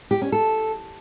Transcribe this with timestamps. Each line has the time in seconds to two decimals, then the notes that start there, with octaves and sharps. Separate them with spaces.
0.11 G4
0.22 C#4
0.32 A4